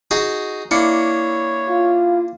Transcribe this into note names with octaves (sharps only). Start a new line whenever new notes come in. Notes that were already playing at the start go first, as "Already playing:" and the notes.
D#4 F#4 G#4
A#3 D4 E4 C#5 C#7
F4